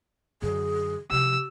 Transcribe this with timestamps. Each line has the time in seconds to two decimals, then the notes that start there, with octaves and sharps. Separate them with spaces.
0.42 F#2 D3 G#4
1.11 C3 F3 G4 E6